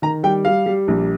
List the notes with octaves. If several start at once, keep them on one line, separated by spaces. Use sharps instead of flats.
D#3 A#5
G3 G5
G3 F5
G3
A#1